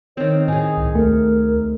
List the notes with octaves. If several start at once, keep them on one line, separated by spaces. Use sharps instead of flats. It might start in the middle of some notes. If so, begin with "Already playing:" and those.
D#3 C4 C#5
A2 D#4 G#4 G#5
C2
D2 A3 A#4